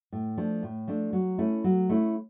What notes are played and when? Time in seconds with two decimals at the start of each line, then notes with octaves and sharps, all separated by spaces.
0.12 A2
0.37 F3 A3 D4
0.63 A2
0.88 F3 A3 D4
1.13 F#3
1.38 A3 C#4 E4
1.64 F#3
1.89 A3 C#4 E4